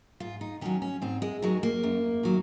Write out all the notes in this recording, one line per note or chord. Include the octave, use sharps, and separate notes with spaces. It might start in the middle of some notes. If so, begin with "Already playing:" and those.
G#2 F4
D#4
D#3 F#3 C#4
C#4
G#2 C4
G#3
D#3 F#3 G#3
A#3
F#2
D#3 F#3